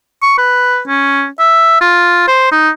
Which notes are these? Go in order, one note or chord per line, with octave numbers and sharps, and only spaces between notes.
C#6
B4
C#4
E5
F4
C5
D#4